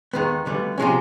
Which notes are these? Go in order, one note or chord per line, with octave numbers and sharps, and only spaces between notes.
D#2 D#3 G#3 B3
D2 D3 G3 B3
C3 F3 G#3 C#4